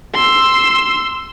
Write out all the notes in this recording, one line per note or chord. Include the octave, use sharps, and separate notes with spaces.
C6 E6